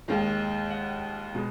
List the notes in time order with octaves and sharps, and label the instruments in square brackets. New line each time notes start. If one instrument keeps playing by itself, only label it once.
[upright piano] D#2 D#3 G#3
F#5
B2 G#3